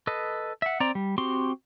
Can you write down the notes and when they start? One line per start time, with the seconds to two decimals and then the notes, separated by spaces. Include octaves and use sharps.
0.07 A4 B4 D#5
0.62 E5 F#5
0.80 C4 D5 A#5
0.95 G3
1.18 C4 F#4 G4 C6